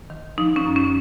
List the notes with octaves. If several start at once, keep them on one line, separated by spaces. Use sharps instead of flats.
D#3
F3 D#4
C#4
F#2
C#4